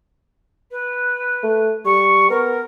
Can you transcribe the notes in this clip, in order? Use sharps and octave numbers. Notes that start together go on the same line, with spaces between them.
B4
A3
G3 C#6
B3 A#4